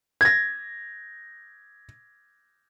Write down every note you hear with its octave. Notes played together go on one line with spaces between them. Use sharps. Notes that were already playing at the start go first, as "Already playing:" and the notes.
G#6 A#6